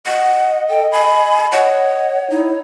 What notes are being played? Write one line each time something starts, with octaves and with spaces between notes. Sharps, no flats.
D#5 F#5
A4 G5
G#5 B5
C#5 D#5 F#5
D#4 E4